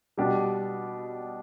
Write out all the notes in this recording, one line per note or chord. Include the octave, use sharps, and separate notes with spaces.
B2 G3 D4 G4